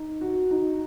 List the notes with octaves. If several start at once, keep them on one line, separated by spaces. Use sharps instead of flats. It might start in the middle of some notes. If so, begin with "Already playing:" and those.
Already playing: D#4
F#4
D#4